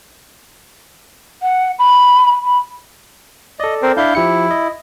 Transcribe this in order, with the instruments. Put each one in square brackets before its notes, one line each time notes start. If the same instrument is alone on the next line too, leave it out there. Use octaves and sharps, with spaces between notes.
[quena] F#5
B5
B5
[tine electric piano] A4 D5 [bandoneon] D#5
[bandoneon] C4 A#4 C5
[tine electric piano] D4 D5 E5 [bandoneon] E4 F5 G6
[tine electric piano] F3 G4 C#7 [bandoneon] E4
[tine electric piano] D#5